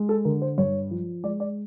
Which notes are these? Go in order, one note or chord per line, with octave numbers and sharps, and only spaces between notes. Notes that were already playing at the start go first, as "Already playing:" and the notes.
Already playing: G#3
A4
D3 A#4
C5
G2 C#5
F3
G#3 D5
D5